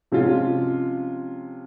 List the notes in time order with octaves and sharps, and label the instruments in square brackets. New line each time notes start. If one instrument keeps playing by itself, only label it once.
[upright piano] C3 F3 G#3 C#4 F4